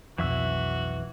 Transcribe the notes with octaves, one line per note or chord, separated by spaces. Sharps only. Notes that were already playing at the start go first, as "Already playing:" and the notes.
B1 F2 E3 F#4 E5 E6